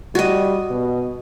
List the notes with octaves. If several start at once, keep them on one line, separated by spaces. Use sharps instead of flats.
G3 F#4 D#5
B2